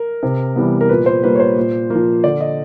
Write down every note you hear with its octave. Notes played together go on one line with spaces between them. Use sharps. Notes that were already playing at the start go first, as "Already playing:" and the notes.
Already playing: A#4
C3
E3 G3 B3
A#4
A#2 B4
C5
G3 A#3 B4
C#5
C5
A#2
F3 A#3
D3 D5
D#5